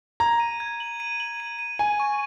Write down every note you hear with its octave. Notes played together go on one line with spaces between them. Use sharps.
A#5 G#6
D#7
G#6
F#7
D#7
F#7
D#7
D#7
G#5 D#7
C#6